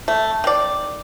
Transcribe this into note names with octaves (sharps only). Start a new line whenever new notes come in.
A3
D#3 D5